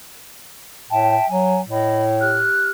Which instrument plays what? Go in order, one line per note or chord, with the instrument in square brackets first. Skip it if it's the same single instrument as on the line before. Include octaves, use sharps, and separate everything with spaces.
[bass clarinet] A2 [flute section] E5 G5 A5
[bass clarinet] F#3 [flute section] G#5
[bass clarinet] A2 [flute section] D#5 B5
[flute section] G4 F6 F#6